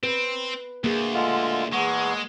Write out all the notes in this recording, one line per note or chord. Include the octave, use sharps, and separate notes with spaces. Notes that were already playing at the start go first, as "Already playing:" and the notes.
C4 B4
D2 A#3 G#4
D3 G#3 F4
E2 G#3 B3 C#6